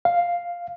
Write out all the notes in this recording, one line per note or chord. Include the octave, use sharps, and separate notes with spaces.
F5